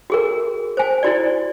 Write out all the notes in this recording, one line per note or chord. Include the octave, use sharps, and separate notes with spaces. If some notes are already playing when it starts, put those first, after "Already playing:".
F#4 G#4 A#4
C5 G#5
E4 F#4 D5